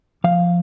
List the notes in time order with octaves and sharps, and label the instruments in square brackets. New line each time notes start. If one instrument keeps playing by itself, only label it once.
[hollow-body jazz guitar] F3 F5